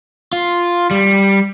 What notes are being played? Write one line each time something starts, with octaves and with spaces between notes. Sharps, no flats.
F4
G3